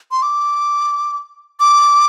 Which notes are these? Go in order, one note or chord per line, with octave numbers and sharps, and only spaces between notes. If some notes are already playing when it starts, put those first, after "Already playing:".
C6
D6
D6